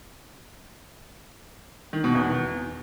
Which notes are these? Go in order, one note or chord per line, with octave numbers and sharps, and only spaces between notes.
D#3
B2
E2